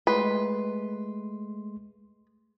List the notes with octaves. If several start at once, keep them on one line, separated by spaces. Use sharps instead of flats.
G#3 A3 B4 C6